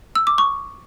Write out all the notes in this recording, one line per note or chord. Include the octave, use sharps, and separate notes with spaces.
E6
D6
C#6